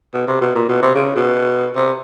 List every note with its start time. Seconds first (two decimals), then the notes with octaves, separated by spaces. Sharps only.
0.14 B2
0.28 C3
0.41 B2
0.55 A#2
0.69 B2
0.82 C3
0.95 C#3
1.16 B2
1.75 C3